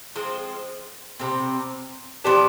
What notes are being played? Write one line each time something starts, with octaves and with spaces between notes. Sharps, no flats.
F3 G#3 C4
C3 G3 C4
F3 B3 D4 G4